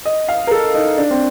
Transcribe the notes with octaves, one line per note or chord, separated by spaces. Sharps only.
D#5
F5
A#4
A4
D#4
D4
C4